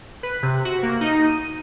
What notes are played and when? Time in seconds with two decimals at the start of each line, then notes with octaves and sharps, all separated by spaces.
0.23 B4
0.43 C3
0.65 F#4
0.83 A#3
1.01 D#4
1.26 D#7